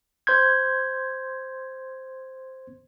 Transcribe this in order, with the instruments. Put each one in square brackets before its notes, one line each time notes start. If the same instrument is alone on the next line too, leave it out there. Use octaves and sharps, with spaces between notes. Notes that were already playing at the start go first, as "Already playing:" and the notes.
[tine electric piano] C5 C6 G6 G#6